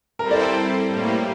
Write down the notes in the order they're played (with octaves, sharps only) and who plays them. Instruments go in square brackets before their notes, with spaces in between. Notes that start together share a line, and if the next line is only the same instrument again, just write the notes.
[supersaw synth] G3 C4 E4 A4 C5 [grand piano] A#4
[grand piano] D5
G5
G5
[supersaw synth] A2 G3 A#3